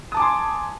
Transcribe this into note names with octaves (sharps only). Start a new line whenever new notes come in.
G#5 A5 C6 D6 D#6